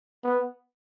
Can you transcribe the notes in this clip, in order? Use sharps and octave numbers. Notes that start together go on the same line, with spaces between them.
B3